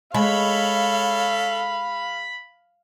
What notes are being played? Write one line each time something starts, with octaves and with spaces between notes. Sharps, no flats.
G#3 A4 C#5 F5 B5